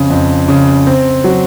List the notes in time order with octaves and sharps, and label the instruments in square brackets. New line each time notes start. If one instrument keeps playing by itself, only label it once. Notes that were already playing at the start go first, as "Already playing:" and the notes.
Already playing: [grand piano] F2 C#3
F2
C#3
C4
F#3